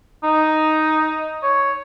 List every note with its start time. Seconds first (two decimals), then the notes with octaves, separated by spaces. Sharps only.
0.23 D#4
1.43 C#5